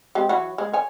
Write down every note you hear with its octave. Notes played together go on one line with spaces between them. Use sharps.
G#3 C4 G4
E3 F#3 F#4
G#3
C#5 G#5